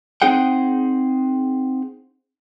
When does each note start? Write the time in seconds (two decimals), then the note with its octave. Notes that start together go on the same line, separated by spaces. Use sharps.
0.22 C4 D#4 G#4 F#5 G5